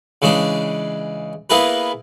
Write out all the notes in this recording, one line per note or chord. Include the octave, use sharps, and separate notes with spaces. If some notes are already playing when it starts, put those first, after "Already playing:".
C#3 E3 G#3 D4
A#3 B3 E4 G#4 A#4 B4